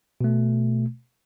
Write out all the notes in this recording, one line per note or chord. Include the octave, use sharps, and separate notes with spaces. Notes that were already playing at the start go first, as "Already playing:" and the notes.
B2 A3